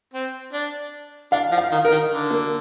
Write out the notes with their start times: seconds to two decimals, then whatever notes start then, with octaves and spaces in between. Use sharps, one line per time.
0.13 C4
0.53 D4
1.32 D4 F5
1.51 F3
1.58 F5
1.72 D#3
1.85 A#4
1.91 D#3
2.11 D3
2.31 A#3